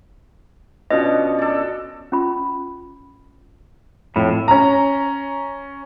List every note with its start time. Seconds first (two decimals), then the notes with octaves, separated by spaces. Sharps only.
0.90 B2 C#4 D4 F4 D#5
1.38 A4 D5
2.12 C#4 F4 B5
4.16 F2 A2 F4
4.48 C#4 A#5